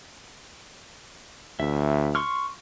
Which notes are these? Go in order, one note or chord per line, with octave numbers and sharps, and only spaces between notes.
D2 E5
C6 C#6 F6